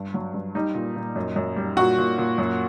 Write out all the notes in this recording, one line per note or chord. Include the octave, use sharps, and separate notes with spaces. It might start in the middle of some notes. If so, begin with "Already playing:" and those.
Already playing: G2
F#3
G2
G3 D#4
A#2
A#2
F#2
F#2
G3
A#2 F#4
A#2
A#2
F#2